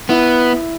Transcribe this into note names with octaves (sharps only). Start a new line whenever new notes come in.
B3 E4